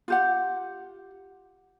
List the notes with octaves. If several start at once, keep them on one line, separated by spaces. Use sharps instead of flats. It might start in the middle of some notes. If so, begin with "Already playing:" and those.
F4 G4 F#5